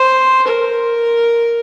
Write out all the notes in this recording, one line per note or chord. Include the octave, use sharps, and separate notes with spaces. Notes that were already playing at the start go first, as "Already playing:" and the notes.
Already playing: C5
A#4